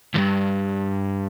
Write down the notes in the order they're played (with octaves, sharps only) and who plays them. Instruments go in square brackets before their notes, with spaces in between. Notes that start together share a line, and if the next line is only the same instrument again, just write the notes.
[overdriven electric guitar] D2 G2